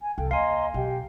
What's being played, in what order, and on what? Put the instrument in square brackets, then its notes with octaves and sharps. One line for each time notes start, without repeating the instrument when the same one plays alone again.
[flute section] G#5
[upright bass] C2 [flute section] A4 F5 G5
[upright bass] D#2 [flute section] D#5 A#5 C6 [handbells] F5 G#5
[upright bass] B1 [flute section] G4 G5